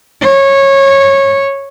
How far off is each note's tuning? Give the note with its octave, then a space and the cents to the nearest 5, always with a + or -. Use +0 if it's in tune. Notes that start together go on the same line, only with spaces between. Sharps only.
C#5 -20